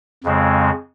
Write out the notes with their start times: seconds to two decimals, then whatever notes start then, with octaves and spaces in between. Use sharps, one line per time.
0.24 F2 C#3 G#3 C4